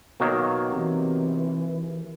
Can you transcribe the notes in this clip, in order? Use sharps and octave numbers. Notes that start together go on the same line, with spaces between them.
B2 D#3 F#3 A#3
C3 E3